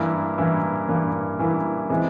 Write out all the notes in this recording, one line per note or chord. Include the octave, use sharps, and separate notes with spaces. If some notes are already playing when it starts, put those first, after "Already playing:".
Already playing: G2 E3 A#3 E4
G2 E3 A#3 E4
G2 E3 A#3 E4
G2 E3 A#3 E4
C3 E3 G#3 E4